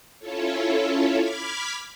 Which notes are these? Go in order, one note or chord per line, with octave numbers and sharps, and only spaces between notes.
C#4 E4 F4 A4 C#5
B5 D6 F6 G#6 B6